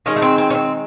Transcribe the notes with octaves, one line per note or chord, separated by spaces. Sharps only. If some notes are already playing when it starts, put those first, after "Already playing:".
D#3 G#3 C#4
A3
C4
C4
C#4
C4